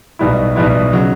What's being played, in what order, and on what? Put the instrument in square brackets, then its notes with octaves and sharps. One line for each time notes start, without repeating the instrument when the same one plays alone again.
[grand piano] B1 B2 G3 B3 E4
B1 B2 G3 B3 E4
C#3 F#3